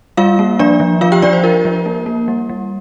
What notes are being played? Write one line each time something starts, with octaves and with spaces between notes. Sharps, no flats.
G3 F4 F5
A#3
F3 D4 D5
F3
F3 F4 F5
G4 G5
F3 D4 D5
C5
F4 A#4
F3
A#3
A#3
G3
G3